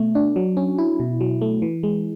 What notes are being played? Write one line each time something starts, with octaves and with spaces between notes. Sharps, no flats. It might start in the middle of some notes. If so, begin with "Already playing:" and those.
Already playing: B2 A3
D4
F#3
C#4
E4
B2
F#3
A3
E3
G#3